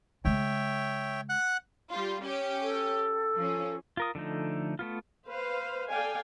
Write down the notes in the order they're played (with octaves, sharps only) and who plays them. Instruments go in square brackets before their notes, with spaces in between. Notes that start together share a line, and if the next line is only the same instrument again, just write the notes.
[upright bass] C#3 G#3 [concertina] C#5 E5 G5
[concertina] F#5 F#6
[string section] G3 F4
C#4 G4
[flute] A4
[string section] F3 C#4
[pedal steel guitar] F4 A#4 D#6
D3 F3 A3 D#4
A3 B3 F4
[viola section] B4 C5 F5
A4 D5 F5 G5 G#5